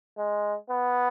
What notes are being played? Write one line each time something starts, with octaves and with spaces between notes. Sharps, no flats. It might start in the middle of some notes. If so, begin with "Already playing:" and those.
G#3
B3